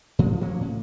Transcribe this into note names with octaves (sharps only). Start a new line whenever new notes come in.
G#2 F3
F3 A#3 C#4
A2